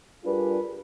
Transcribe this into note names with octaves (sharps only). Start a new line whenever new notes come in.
G3 D4 F4 G#4 A#4 B4